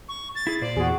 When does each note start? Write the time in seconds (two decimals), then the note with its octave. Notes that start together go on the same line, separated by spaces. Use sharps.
0.08 C#6
0.35 A6
0.47 E4 G#4
0.61 A#2 C5 D5
0.77 E2 F#4 G#4